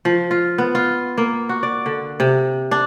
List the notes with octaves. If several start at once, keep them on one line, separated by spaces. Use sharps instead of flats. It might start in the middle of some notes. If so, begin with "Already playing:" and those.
F3
F4
B3
F4
A#3
F#4
D5
D3
C3
D4